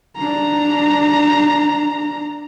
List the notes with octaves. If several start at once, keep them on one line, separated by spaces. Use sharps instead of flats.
D4 A#5